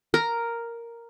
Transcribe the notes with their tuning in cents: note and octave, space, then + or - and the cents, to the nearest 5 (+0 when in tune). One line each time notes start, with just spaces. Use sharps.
A#4 +0